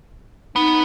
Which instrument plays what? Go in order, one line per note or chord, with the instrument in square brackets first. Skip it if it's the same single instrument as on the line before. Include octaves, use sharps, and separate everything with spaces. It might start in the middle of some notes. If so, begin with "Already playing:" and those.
[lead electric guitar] B3 [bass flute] D#4